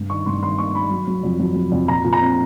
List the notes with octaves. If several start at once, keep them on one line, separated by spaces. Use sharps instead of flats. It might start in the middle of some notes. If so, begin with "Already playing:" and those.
Already playing: G2 G3
D#3 C#6
G2 C6
D#3 C6
A#3 C#6
D#3 B5
F#3
F#3
F2
F#3
F#3
F2
A#2 A#5
A#2
A#5
C4